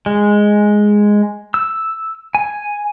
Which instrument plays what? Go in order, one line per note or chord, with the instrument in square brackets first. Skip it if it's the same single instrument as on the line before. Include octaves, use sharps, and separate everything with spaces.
[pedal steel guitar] G#3
E6
G#5